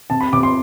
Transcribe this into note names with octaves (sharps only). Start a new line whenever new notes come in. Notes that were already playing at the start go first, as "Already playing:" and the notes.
C3 A5
B5
C3 D6
C6